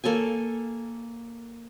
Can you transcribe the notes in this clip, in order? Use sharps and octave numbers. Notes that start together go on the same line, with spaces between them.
A#3 A4 C#5 G#5